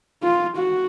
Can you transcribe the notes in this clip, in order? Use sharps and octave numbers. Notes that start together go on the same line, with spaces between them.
F4
F#4